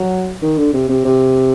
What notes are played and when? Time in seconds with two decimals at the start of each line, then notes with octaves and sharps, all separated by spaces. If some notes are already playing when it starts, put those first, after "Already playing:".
Already playing: F#3
0.43 D#3
0.58 D3
0.73 C3
0.89 C3
1.05 C3